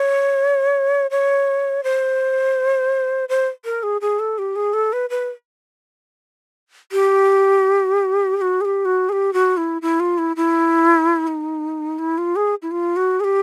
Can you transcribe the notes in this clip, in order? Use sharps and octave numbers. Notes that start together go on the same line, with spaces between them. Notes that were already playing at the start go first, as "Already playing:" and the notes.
Already playing: C#5
C#5
C5
C5
A#4
G#4
G#4
A4
G4
G#4
A4
B4
B4
G4
G4
F#4
G#4
G4
F#4
G#4
G4
F#4
E4
E4
F4
E4
E4
D#4
E4
F4
G#4
E4
F4
F#4
G#4
G4